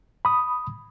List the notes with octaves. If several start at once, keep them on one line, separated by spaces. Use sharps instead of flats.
B5 D#6